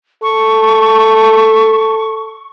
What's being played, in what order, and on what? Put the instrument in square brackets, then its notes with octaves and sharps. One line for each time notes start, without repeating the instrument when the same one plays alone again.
[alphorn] A4 [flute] C#6